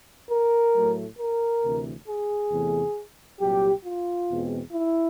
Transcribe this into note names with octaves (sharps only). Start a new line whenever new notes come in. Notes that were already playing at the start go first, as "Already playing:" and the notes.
A#4
A2 F#3 A3
A#4
D2 C3 E3
G#4
E2 C3 E3 A3
C2 A#2 F#3 G4
F4
E2 B2 G#3 C4
E4